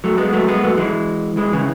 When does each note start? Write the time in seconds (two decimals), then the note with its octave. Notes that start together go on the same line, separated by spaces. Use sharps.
0.04 F#3 A3
0.18 G#3 B3
0.33 F#3 A3
0.48 G#3 B3
0.63 F#3 A3
0.77 E3 G#3
1.37 E3 G#3
1.53 C#3 E3